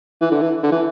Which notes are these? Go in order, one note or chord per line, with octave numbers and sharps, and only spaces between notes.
E3
D3
E3
D3
E3